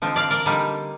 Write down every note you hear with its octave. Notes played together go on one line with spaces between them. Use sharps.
D3 F3 C4 D#4
D5 F5
A#4 D5
D3 G3 A#3 D#4